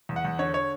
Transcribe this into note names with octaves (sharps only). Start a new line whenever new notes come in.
E2
F#5
E2
D3 C#5
C#5